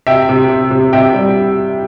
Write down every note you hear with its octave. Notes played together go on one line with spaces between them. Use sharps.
C3 E5 G5
C3
C3
C3
C3 E5 G5
G3